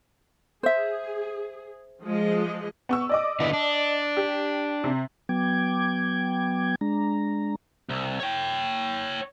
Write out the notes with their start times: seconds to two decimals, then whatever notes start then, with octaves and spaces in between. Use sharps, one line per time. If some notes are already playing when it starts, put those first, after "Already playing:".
0.63 G#4 C5 E5
2.04 F3 G#3 D#5
2.89 B3 C#6 E6
3.09 D5 D#5 D6
3.40 D3 B3 E4
3.53 D4
4.17 G4
4.84 C3
5.29 F#3 B3 G5 D6 G#6
6.81 G#3 D4 A#5
7.89 C2
8.20 C#5 G5